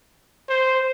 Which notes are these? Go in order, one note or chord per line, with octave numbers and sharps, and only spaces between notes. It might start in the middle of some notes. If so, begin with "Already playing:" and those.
C5